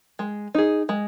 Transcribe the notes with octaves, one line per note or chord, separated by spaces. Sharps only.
G#3
D#4 G#4
G#3